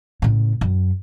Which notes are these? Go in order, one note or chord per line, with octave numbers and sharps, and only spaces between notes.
A2 C#3
F#2